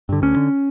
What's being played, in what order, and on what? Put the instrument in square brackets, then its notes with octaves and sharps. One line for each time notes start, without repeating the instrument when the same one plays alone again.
[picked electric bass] G2 D3
D2 C#4
D3